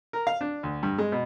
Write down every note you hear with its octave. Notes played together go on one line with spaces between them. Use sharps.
A#4
F5
D4
D2
G2
G#3
B2